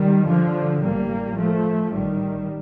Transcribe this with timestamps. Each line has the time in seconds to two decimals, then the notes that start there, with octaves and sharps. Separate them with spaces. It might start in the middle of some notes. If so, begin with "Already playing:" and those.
Already playing: D#3 G3
0.27 D3 F3
0.82 A1 A2 G3 A#3
1.38 F3 A3
1.93 A1 A2 D#3 G3